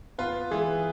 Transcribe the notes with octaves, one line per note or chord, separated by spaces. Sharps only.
B3 F4 B4
E3 G#3 G#4